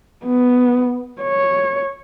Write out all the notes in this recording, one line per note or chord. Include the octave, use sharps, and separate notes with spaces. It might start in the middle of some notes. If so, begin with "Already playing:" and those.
B3
C#5